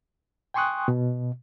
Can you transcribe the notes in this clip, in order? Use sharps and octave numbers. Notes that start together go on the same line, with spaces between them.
G5 G#5 C6 C#6 D#6 F#6
B2